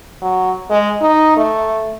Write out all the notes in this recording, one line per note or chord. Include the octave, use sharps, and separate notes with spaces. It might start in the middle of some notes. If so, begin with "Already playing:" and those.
F#3
G#3
D#4
A3